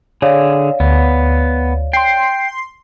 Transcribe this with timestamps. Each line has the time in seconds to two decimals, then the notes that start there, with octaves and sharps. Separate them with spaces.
0.22 D3 G#4 C#5 D5 F5
0.80 D2 B3
1.93 G5 C6 C7